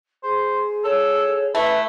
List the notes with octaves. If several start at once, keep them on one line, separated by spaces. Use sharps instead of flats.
G#4 C5
A4 C#5
A3 E4 B4 E5